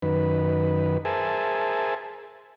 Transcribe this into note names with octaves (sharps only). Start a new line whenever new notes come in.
F#2 D#3 B4
G#4 A#4 C5 E5 G#5 A5